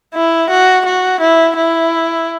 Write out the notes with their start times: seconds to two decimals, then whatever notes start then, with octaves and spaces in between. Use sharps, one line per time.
0.14 E4
0.50 F#4
0.85 F#4
1.20 E4
1.56 E4